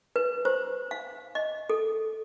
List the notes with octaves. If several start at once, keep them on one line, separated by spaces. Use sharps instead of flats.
B4
C5
F5
D#5
A4